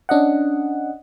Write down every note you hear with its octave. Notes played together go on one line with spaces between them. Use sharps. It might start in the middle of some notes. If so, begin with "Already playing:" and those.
C#4 D4 D#5 F#5